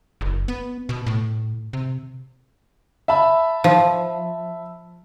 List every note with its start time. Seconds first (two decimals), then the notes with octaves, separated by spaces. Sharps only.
0.21 F#1
0.48 B3
0.89 B2
1.07 A2
1.73 C3
3.08 E5 A5 B5
3.64 F3